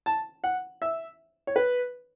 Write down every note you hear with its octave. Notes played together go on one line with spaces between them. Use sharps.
A5
F#5
E5
C#5
B4